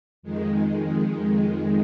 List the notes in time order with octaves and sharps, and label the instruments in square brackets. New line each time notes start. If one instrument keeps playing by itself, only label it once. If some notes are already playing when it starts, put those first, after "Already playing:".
[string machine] F2 D#3 G#3